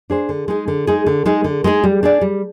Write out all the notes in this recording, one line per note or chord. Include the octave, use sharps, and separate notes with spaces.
D4 G#4 C5
D3
G#3 D#4 G#4
D3
G#3 D#4 G#4
D3
G#3 D#4 G#4
D3
G#3 D#4 G#4
G3
D4 G#4 D5
G3